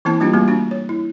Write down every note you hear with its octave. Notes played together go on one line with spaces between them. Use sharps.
E3 A#3 C4 E4 A5
G3 A#3 D4 F4 G4
G3 A3 A#3 C4 F#4
C4 D4 F#4
C#5
E4